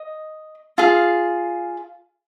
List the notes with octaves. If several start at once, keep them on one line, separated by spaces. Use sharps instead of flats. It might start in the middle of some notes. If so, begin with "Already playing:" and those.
Already playing: D#5
F4 G#4 F5